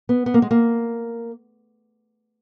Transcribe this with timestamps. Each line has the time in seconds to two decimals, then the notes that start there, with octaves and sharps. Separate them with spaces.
0.09 B3
0.26 B3
0.34 A#3
0.42 G#3
0.51 A#3